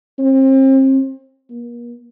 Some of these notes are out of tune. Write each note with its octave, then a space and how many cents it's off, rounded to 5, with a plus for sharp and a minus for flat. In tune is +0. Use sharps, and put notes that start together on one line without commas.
C4 +35
A#3 +40